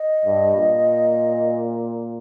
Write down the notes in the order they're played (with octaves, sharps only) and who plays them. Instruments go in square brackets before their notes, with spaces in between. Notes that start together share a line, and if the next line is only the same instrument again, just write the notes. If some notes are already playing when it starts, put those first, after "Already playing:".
Already playing: [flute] D#5
[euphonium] G2
A#2